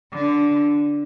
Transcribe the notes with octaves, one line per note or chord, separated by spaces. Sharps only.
D3